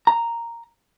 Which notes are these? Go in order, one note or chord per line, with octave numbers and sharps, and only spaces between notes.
A#5